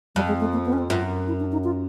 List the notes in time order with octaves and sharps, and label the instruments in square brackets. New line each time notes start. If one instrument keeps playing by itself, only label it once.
[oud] F2 [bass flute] G3
[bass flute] G#3
A3
A#3
B3
C#4
C4
[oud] F#2 [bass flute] F4
[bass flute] E4
D4
D#4
F4